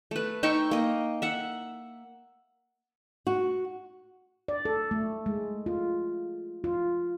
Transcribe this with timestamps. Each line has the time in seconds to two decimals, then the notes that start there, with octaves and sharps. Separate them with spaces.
0.11 A3 B4
0.43 D#4 E5 G5 C#6
0.71 A#3 D#5
1.22 E5 F#5
3.27 F#4
4.48 D5
4.65 A4
4.91 A3
5.26 G#3
5.66 F4
6.64 F4